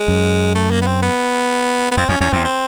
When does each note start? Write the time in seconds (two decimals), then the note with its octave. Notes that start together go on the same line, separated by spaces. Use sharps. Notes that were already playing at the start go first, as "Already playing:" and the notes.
Already playing: G#3
0.08 F#2
0.55 A3
0.71 A#3
0.82 B3
0.87 C4
1.03 B3
1.91 B3
1.97 F2 C4
2.09 F2 C#4
2.21 E2 C#4
2.33 E2 C4
2.45 C4